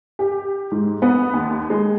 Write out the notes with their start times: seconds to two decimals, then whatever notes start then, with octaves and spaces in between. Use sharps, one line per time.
0.19 G4
0.72 G#2
1.02 B3
1.34 D#2
1.70 G#3